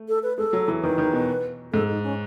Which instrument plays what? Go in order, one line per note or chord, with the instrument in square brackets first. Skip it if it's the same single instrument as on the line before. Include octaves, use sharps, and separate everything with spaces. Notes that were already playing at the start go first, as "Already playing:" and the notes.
Already playing: [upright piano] A3
[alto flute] A4
B4
[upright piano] G#3 [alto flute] A4
[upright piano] F#3
E3
[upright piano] D#3 [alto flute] B4
[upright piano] D#3
B2
[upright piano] G#2 [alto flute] A4
[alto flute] D#4
C#4